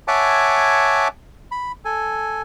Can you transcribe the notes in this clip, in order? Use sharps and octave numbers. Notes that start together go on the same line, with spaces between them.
C#5 E5 F#5 G#5 A5 D6
B5
A4 G#5